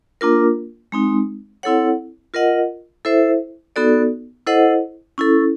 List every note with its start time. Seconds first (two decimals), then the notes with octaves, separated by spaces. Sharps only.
0.21 A#3 D4 F4 A#4
0.92 G#3 C4 D#4
1.63 C4 E4 A4 C#5 F#5
2.34 F4 A#4 D#5 F#5
3.05 E4 A4 C5 E5
3.76 B3 D#4 F#4 A4 D5
4.47 E4 A4 C5 D#5 F#5
5.18 C#4 E4 A4